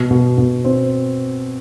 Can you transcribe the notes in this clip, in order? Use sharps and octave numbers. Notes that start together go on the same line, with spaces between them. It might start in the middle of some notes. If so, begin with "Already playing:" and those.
Already playing: B2
B2
B2
C4